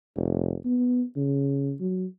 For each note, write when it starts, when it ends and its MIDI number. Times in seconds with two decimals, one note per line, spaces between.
0.16 0.55 29
0.65 1.03 59
1.16 1.73 49
1.80 2.05 54